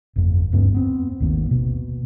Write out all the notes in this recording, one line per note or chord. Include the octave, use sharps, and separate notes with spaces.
G1 F2
D1 G2 B3 C#4
B3 C4
G#1 D#2 A#3
B2